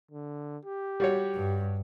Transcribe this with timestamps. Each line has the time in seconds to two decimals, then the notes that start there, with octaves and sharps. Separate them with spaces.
0.11 D3
0.65 G4
1.00 G3 F#4 C#5
1.35 G2